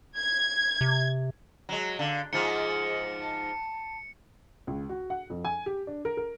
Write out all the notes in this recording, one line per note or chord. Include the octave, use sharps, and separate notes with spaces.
G#6
C3
F#3 G#3
D3 F5
G#2 F3 F4 G#4 C#7
A5
C#2
F#4
F#5
F2
G#5
G4
D4
A#4
A#4